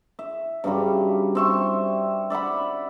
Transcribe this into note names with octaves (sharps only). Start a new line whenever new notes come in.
E5
G2 C#3 F#3 G3
C4 E5 C#6
D5 E5 F#5 B5